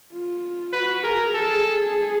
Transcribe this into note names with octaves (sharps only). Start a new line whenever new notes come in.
F4
F#4 B4
G#4 A#4
G#4 A4